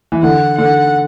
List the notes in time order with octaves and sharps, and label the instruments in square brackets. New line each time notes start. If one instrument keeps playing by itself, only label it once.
[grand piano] E3
[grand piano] D3 [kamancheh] F#5
[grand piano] D3 [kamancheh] F#5